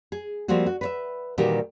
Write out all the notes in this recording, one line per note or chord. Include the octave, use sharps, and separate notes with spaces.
G#4
F3 G3 A#3 C4 F#4
F#4
B4 C#5 E5
A#2 D#3 E3 G3 F#4 G4